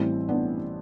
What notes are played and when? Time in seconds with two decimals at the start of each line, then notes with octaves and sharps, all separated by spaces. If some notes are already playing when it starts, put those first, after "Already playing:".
Already playing: A1 A2 E3 G3 C4 E4
0.29 B3 D4